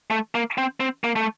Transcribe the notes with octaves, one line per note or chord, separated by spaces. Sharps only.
A3
A#3
C4
C4
A#3
A3